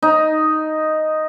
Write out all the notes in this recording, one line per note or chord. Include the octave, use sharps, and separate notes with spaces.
D#4